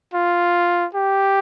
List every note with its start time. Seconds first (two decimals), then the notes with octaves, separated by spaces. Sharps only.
0.14 F4
0.94 G4